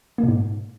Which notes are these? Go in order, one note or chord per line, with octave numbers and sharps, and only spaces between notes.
A#3
B2
G#2